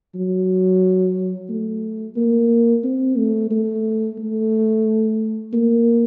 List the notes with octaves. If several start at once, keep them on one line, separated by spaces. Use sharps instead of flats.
F#3
A3
A#3
C4
A3
A3
A3
A#3